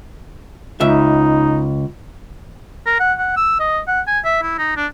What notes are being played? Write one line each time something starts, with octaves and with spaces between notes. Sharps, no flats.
C#2 D#4 E5
A#4
F#5
F#5
E6
D#5
F#5
G#5
E5
E4
D#4
D4